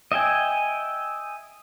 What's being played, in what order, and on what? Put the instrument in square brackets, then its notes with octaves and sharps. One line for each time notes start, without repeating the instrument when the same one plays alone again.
[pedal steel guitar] D#5 E5 G5 G#5